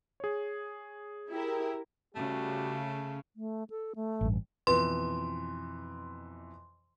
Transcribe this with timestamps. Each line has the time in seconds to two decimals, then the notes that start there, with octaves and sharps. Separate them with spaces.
0.20 G#4 C#5
1.30 E4 G4 A#4
2.15 C#3 G3 A3 F#4 G4
3.36 A3
3.70 A4
3.96 A3
4.21 A1 G2
4.67 F2 B2 E3 B4 C6